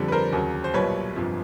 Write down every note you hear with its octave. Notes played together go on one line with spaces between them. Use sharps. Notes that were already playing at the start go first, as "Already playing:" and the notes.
Already playing: F2 D3 G3
B4
A#4 C5
D#2 C#3 F#3
C5
B1 A#2 G3 B4 C#5
G1 F2 C3 F3